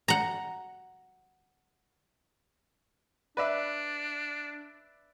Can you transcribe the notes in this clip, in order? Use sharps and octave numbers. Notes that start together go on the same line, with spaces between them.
F#5 A#5
D4 B4 D5 E5